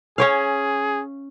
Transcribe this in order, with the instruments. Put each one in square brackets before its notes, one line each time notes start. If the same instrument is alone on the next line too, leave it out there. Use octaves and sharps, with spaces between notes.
[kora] C#4 C#5 F5 [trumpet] G#4